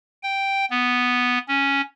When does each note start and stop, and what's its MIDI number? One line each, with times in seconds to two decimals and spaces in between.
0.23 0.65 79
0.70 1.39 59
1.48 1.81 61